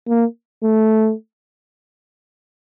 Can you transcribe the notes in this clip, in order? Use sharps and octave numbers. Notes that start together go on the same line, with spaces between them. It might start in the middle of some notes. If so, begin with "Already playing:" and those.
A#3
A3